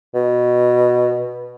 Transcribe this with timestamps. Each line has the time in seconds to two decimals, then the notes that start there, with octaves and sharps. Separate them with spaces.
0.15 B2